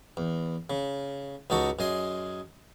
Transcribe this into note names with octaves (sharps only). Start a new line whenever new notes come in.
E2
C#3
C#2 D#4 F#4 A4 C#6
F#2 G#4 D#5 C6